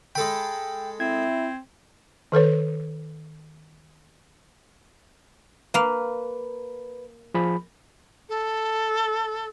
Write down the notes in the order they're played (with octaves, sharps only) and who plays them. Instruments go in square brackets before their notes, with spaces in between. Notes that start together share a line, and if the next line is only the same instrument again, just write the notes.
[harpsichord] G#3 A4 B5 [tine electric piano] G5
[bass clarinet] C4 [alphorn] E4 [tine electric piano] G#6
[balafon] D#3 A4 B4 C#5
[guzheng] A#3 F5 [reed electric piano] B4
[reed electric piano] F3 G#4 B5
[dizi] A4